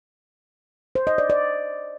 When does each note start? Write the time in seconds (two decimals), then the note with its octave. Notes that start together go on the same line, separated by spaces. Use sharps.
0.95 C5
1.07 D#5
1.18 D5
1.30 D5